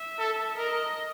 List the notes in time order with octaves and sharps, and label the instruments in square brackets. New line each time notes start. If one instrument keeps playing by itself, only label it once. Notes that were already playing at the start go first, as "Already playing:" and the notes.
Already playing: [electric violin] E5
[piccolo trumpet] A4
[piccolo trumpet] A#4 [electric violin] D#5